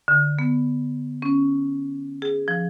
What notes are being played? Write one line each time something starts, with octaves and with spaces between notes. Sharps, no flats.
D3
B3
C#4
G#4
F3